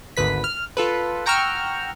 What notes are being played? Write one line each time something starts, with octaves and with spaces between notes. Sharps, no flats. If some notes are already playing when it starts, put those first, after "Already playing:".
G#1 D2 B4 B6
F6
F4 A4 B4
F#5 G5 A#5 C#6 E6 F6